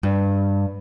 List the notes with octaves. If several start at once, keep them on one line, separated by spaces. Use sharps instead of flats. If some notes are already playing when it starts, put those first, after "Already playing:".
G2